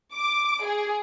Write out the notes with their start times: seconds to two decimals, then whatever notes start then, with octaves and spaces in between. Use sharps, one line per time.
0.14 D6
0.65 G#4